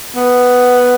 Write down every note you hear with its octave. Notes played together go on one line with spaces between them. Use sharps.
B3